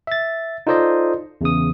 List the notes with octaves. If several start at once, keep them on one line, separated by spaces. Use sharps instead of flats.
E5 A6
D#4 F4 A4 C5 D5 D#5
E2 C#3 D#6